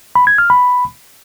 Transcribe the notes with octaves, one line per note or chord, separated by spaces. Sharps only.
B5
G#6
F6
B5